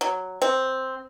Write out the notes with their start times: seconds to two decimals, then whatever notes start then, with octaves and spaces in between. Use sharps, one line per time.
0.01 F#3
0.42 C4